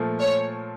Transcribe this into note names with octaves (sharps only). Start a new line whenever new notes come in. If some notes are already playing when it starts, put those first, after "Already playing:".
Already playing: A#2 F3 A3
C#5